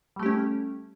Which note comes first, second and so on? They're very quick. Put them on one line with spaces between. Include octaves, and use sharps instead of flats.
G3 A3 G4 C#4